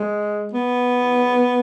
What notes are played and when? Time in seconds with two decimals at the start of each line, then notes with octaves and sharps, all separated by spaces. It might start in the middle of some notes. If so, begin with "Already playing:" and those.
Already playing: G#3
0.53 B3